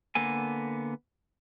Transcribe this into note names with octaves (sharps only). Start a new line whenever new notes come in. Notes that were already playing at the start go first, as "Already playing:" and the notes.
D3 A#3 B3 A4 G#5